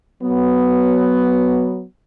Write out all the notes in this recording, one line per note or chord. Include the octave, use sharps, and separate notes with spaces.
F#3 B3